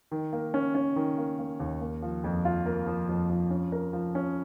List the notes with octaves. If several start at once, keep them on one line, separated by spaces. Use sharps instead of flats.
D#3
A#3
C#4
C#4
D#3
A#3
A#3
D#2
A#3
F3
F2
F4
A#3
F3
F2
F3
C#4
A#4
F3
C#4